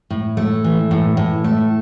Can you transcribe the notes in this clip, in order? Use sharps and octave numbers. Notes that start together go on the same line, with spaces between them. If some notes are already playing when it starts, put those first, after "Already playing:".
A2
A3
E3
A2
A2
A3